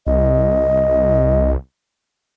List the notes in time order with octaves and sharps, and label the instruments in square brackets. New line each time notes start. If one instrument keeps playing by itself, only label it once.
[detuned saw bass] C2 [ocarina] D#5